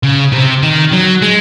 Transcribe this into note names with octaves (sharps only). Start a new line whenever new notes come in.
C#3
C3
D#3
F#3
G#3